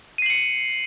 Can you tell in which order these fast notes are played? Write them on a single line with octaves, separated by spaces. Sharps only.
D#7 C7 F#7 C#7